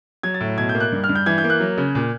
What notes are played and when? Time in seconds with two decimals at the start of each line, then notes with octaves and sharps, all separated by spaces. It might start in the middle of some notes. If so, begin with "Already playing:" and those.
0.23 F#3 G#6
0.34 A6
0.41 A2
0.58 B2 G#6
0.69 G6
0.75 A#3
0.80 F#6
0.92 G2
1.04 F6
1.09 G2
1.15 G6
1.26 E3 G#6
1.38 G6
1.44 A#3
1.50 F#6
1.60 F#3
1.77 C#3
1.95 A#2